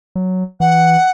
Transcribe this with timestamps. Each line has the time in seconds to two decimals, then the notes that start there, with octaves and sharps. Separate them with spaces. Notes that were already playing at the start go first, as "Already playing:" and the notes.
0.15 F#3
0.60 E3 F#5